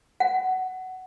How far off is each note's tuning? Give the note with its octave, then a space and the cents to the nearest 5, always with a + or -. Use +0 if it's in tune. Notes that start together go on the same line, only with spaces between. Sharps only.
F#5 +10